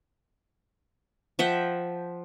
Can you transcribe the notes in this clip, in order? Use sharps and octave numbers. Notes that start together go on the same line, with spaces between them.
F3 E5 F#5 G5